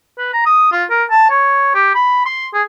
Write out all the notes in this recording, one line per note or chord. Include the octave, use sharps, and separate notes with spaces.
B4
A#5
D#6
F4
A#4
A5
C#5
G4
B5
C6
G#4